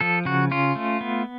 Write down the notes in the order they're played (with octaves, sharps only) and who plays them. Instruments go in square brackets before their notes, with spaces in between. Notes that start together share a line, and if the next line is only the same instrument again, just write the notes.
[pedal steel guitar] F3 A4
C#3 F#4
C#4 F4
A3
B3